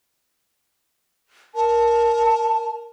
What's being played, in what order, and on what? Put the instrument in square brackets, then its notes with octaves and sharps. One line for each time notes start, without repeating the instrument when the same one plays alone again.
[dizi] A#4 [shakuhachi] A5